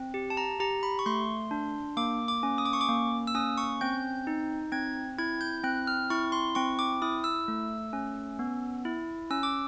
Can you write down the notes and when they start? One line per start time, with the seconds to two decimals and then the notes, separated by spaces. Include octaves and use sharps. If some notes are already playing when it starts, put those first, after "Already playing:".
Already playing: C4
0.14 G4
0.30 A5
0.37 A#5
0.60 G4 A#5
0.83 B5
0.99 C#6
1.06 A3 C6
1.51 D4
1.97 A#3 D6
2.28 D6
2.43 C#4
2.58 D#6
2.65 D6
2.73 C#6
2.81 D6
2.89 A#3
3.27 E6
3.35 C#4 D#6
3.58 C#6
3.81 C4 G6
4.27 D#4
4.72 C4 G#6
5.18 E4 G#6
5.41 G6
5.64 C4 F#6
5.87 F6
6.10 E4 C#6
6.32 C6
6.55 C4 C#6
6.79 D6
7.02 E4 D#6
7.24 E6
7.48 A3
7.93 C#4
8.39 B3
8.85 E4
9.30 C#4 E6
9.43 D6